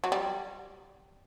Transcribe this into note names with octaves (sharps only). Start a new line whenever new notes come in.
F#3
G3